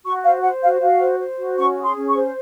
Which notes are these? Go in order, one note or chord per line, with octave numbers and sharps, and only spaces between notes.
F#4 C#6
C5 F5
C5 F#5
F#4 F5
F#4 F5
C5
C5
F#4
C#4 C#6
G#4
C6
C#4
C#6
C5